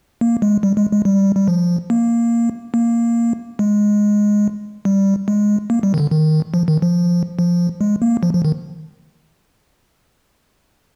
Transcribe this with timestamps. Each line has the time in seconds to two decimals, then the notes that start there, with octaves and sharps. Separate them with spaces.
0.21 A#3
0.42 G#3
0.63 G3
0.77 G#3
0.92 G#3
1.05 G3
1.36 G3
1.48 F3
1.90 A#3
2.74 A#3
3.59 G#3
4.85 G3
5.28 G#3
5.70 A#3
5.83 G3
5.94 D#3
5.98 D3
6.11 D#3
6.54 F3
6.68 D#3
6.82 F3
7.39 F3
7.81 G#3
8.02 A#3
8.23 F3
8.33 F3
8.45 D#3